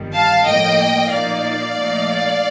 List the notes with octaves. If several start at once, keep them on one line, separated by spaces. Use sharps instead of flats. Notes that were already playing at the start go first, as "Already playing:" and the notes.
Already playing: G1 F2 D#3 G3
F5 A5
A2 F3 A#3 D#5 G5
A#2 F3 A#3 D#4 D5 F5
A#2 F3 A3 D#4